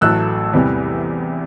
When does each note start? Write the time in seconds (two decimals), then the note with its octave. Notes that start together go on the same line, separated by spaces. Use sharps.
0.01 A1 A2 F#3 A3 E6 F#6
0.53 E2 C3 E3 G3